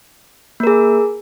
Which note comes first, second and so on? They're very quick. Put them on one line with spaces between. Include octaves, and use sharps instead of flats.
A#3 A#4 G#4